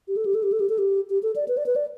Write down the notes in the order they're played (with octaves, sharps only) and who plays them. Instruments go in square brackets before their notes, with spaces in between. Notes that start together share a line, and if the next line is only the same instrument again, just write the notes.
[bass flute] G4
A4
G4
A4
G4
A4
G4
A4
G4
G4
A4
D5
B4
D5
B4
D5